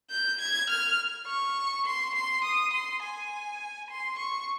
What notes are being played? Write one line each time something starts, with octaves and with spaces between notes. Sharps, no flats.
G6
G#6
F6
C#6
C6
C6
D#6
C6
G#5
C6
C#6